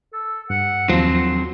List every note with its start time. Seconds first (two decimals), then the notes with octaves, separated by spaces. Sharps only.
0.13 A4
0.50 G2 F#5
0.89 D#2 F3 F#3 C4 C6